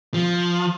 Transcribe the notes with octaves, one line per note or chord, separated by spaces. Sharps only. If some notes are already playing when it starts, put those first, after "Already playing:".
F3